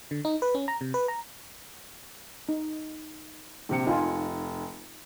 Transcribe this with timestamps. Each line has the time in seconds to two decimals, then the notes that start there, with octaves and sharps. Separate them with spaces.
0.11 D3
0.25 D#4
0.42 B4
0.55 C#4
0.68 A#5
0.81 C3
0.94 B4
1.08 A#5
2.49 D#4
3.69 A#1 C3 C#7
3.86 F1 D#4 F4 G#5